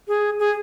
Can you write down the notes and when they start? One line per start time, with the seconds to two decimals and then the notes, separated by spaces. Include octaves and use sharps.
0.08 G#4
0.39 G#4